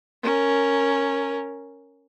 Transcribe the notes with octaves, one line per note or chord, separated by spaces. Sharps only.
C#4 A#4